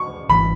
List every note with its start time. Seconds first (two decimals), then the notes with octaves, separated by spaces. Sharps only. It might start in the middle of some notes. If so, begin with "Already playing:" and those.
Already playing: C#6
0.29 G#1 G2 E3 B5